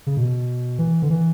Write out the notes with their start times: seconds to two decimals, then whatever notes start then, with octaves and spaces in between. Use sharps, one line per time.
0.07 C#3
0.17 B2
0.79 E3
1.02 D3
1.10 E3